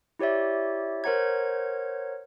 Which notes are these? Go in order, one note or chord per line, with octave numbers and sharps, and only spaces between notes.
E4 G4 C#5 D5 E5
A#4 C5 C#5 F#5 A#5 G#6